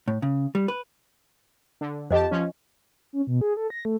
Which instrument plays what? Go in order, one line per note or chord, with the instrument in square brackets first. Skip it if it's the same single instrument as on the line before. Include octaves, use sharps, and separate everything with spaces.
[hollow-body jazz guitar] A2
C#3
G3
B4
[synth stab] D3
[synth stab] F2 G4 A5 [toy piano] C5 D#5
[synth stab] F3 C#4
[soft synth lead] C#4
B2
G#4
A4
A#6
A3